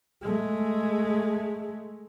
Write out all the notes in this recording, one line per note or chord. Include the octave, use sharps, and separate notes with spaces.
G#3 A3